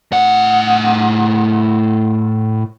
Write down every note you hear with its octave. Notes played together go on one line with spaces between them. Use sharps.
A2 F#5